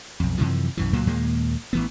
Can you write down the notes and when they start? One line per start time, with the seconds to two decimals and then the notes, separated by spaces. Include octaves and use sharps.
0.20 B1 F2
0.38 F#2 C3 E3 F3
0.77 B1 F#2 E3
0.93 C#2 A#2 F#3 A#3
1.07 D#2 A#2 G#3 A#3
1.73 A1 E3 B3